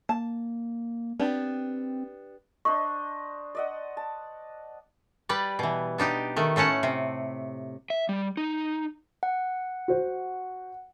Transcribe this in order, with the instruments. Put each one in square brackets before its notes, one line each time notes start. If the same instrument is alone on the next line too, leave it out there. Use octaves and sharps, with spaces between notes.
[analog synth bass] A#3 [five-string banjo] A5
[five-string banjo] B3 D4 G4 [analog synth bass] C4
[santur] D4 C5 D#5 [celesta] C#6
[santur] D5 D#5 F#5
A5
[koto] G3 B4 D5
B2 E3
B3 D4 D#4 G4
D#3 A3
A2 A3 C#4 F#5 A5
C3
[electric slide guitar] E5
G3
D#4
[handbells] F#5
[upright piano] F#4 C5